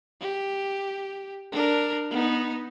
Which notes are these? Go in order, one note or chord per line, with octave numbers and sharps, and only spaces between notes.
G4
D4 A#4
B3 D#4